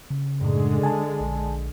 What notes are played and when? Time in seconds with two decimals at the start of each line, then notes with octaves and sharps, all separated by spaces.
0.10 C#3
0.41 F#2 A2 D3 G#3
0.83 G#5 A5
1.20 A#1